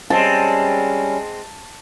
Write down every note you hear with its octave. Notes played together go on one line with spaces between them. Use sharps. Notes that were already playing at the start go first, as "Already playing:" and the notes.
G3 G#3 C4 C#4 A5